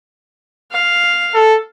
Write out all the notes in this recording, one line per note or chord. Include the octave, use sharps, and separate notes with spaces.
F5
A4